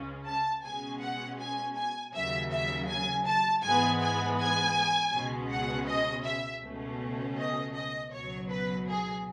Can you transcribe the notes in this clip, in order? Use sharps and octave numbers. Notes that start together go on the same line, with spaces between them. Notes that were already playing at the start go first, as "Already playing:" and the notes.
Already playing: C#2 C#3 G#3 C#4
A5
B2 G#3 C#4 G#5
F#5
G#5
G#5
D#2 C#3 F#3 E5
E5
G#5
A5
G#2 E3 G#3 B3 G#5
G#5
G#5
C#2 B2 G#3 C#4
F#5
D#5
E5
C#2 B2 A3 C#4
D#5
D#5
C#2 B2 F#3 C#5
B4
G#4